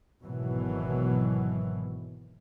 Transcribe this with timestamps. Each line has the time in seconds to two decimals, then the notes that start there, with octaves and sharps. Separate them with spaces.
0.24 G#1 B2 E3 F#3